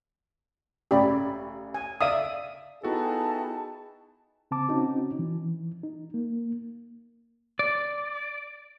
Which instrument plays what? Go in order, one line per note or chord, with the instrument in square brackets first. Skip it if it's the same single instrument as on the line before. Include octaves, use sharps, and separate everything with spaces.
[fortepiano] A1 C#3 B5 [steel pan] G4 D5
[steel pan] G#5
[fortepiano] D5 E5 F5 [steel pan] D#6
[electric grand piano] B3 F#4 A4 [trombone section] D#4 G#4 [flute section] E4 G5 A5
[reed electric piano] C#3 C4 A5 D6
C4 C#4 D#4 F#4
E3
D#4
A#3
[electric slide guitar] D5